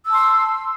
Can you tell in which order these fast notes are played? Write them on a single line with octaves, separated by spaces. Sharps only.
E6 A5 C6